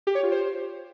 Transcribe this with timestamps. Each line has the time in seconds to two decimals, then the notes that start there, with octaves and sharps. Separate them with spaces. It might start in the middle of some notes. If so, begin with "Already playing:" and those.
0.07 G4
0.15 C#5
0.23 F4
0.31 C5